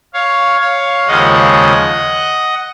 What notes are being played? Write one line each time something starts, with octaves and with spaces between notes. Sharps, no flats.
C#5 F5
C#5 F5
D#2 C#3 F3 G#3 C#4 D#5 F#5